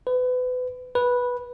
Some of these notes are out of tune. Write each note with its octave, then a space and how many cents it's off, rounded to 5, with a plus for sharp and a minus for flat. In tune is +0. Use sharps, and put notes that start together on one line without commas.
B4 +30
B4 -10